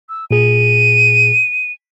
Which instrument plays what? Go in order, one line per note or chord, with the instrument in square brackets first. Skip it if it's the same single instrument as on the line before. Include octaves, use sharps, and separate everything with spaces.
[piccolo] E6
[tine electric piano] A#2 G#4 [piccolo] D#7